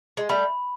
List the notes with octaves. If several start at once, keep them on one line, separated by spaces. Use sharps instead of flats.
G#3
G3 A3 B5